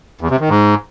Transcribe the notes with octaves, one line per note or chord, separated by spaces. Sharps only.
E2
C3
D#3
G#2